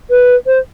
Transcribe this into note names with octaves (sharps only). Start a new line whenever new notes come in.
B4
C5